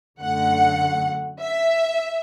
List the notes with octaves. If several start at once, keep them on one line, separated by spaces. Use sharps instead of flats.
F#2 D3 A3 F#5
E5